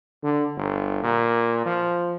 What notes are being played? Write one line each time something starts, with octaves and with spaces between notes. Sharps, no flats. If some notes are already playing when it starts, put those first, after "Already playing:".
D3
G1
A#2
F3